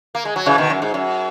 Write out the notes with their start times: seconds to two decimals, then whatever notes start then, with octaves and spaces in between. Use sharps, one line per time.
0.15 A#3
0.25 G#3
0.36 F#3
0.46 C#3 E3
0.58 B2 D#3
0.70 F#2
0.82 G#2
0.94 F#2